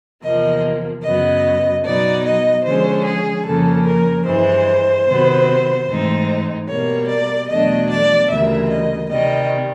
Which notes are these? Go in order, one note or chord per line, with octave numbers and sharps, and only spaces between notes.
E2 C3 F3 A#3 D#5
F#2 C#3 F#3 B3 D#5
B2 F#3 B3 D#4 D5
D#5
D3 F3 G#3 C#4 C5
G#4
F2 C#3 F3 A#3 C#4 A4
A#4
G2 E3 G#3 C5
C3 D#3 F#3 B3
G#2 E3 A3 C4 D#4
B2 G3 A#3 C#5
D5
E2 B2 F#3 A3 D4 D#5
D5
D2 C#3 E3 G3 A#3 E5
D#5
C3 D#3 G3 D#5